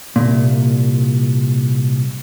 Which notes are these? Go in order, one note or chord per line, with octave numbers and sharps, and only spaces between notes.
C2 F#2 A#2